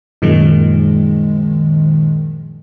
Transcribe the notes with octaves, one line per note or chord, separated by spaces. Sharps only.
F#2 A#2 D#3 F3 G#3